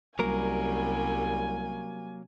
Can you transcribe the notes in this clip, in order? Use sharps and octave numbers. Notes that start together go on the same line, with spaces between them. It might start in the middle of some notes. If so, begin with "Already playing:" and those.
C2 C3 F#3 G3 A#3 C#4 A#4 G#5